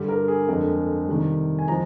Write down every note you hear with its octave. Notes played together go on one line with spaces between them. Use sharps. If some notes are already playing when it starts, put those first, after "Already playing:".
Already playing: G2 D3 G3
A#4
G#4
F2 D3 G#3 A#4
C3 D#3 G3
G#5
F3 G#3 A#5